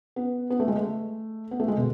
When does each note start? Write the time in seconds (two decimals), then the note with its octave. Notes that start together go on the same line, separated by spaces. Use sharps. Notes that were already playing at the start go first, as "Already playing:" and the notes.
0.16 B3
0.50 B3
0.60 A3
0.68 G#3
0.75 A3
1.51 B3
1.60 A3
1.68 G#3
1.77 B2